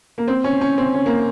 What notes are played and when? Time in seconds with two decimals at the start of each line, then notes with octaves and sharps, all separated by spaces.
0.18 A#3
0.28 C4
0.44 C#4
0.61 C#4
0.78 C4
0.95 C#4
1.06 A#3